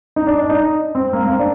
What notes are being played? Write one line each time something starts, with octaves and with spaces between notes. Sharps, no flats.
D#4
D4
D4
D#4
C4
A#3
A#3
C4
D4